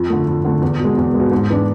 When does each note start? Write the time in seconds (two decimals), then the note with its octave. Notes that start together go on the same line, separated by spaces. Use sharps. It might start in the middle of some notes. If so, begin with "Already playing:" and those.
Already playing: F2
0.10 D3 A3
0.27 F2
0.44 D3 A3
0.62 E2
0.80 B2 G#3
0.97 E2
1.14 G#3
1.20 B2
1.31 G#2
1.50 E3 B3 D4